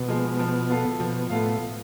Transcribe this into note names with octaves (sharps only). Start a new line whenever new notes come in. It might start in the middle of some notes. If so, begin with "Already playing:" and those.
Already playing: B2
F3 G#3
F3
B3 F4 A4 F5
B2 F3
A2 B3 F4 A4 F5